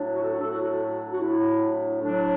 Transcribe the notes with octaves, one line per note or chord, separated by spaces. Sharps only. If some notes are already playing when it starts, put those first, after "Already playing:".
Already playing: A2 F#3 D4
F#4
A4
F#4
A2 F#3 D4 A4
F#4
A4
F#4
F#4
A2 F#3 D4 E4
A2 F#3 D4